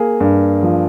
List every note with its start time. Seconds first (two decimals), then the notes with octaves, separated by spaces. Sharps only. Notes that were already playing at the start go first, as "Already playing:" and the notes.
Already playing: A#3 G#4
0.20 G2
0.63 F3